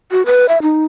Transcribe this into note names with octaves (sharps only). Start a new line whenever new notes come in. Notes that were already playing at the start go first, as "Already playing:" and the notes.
F#4
B4
E5
D#4